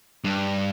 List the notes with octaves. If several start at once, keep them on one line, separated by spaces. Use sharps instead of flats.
G2